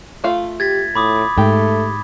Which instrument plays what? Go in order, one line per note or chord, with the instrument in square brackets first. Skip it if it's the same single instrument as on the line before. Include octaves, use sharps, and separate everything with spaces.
[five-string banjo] A3 F4 F5
[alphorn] G4 [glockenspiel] G#6 A6 B6
[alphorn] A2 [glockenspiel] B5 D6 D#6
[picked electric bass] G#2 [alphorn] A3 [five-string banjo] G4